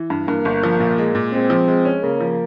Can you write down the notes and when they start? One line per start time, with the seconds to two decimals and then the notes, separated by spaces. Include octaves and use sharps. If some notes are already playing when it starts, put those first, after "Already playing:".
Already playing: E3
0.10 G2
0.28 G2 A#3
0.45 G1
0.63 F3
0.80 A#2
0.98 G#3
1.15 A#2
1.33 G#3 C4
1.50 F3
1.68 G#3
1.85 C#4
2.03 C#3 A#3
2.20 F3